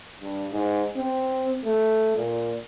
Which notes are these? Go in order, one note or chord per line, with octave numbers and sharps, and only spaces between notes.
G2
G#2
C4
A3
A#2